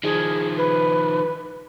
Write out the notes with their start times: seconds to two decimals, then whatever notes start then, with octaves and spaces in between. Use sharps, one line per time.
0.04 D#3 F3 G#4
0.57 B4